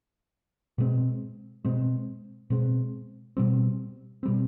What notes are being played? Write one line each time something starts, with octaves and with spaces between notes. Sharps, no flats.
B2 G#3 C4
B2 G#3 C4
B2 G#3 C4
B2 G3 C4
B2 G3 C4